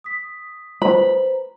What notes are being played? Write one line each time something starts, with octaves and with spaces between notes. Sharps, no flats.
D#6 B6
B4 C5 A#5 B5